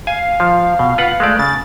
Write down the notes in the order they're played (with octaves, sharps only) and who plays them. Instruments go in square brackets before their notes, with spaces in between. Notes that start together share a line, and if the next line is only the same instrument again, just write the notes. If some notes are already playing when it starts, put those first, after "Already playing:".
[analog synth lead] F5 [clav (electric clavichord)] G#5
[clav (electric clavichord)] F3
B2
F4 B4 F#5
G#3 A3 D5
[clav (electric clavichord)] C#3 [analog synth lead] A6